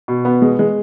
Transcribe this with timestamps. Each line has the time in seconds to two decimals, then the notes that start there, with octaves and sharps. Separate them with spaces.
0.08 B2
0.25 B3
0.42 G#3
0.59 G#3